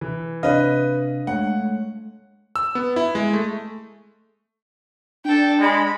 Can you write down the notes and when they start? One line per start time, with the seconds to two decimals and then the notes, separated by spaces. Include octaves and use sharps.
0.01 E3
0.43 C3 D4 B4 D#5 F5
1.27 G#3 A3 C#5 F#5
2.56 E6
2.75 B3
2.96 E4
3.15 G#3
3.33 A3
5.25 D4 A4 G5
5.60 G#3 B5